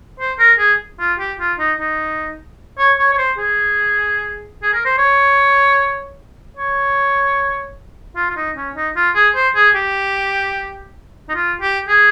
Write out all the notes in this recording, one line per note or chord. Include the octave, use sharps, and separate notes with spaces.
C5
A#4
G#4
F4
G4
F4
D#4
D#4
C#5
C#5
C#5
C5
G#4
G#4
A#4
C5
C#5
C#5
F4
F4
D#4
C#4
D#4
F4
G#4
C5
G#4
G4
D#4
F4
G4
G#4